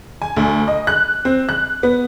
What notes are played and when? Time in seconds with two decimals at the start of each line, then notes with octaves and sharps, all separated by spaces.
0.22 G#5
0.37 D2
0.68 D#5
0.87 F#6
1.25 C4
1.49 F#6
1.83 B3